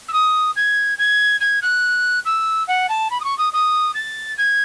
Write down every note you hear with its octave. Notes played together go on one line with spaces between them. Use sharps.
E6
D#6
G#6
G#6
G#6
F#6
E6
F#5
A5
B5
D#6
C#6
D#6
D#6
A6
G#6